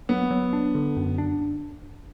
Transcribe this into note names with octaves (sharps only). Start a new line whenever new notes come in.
F#3 B3
F#3
D4
D3
F#2
D4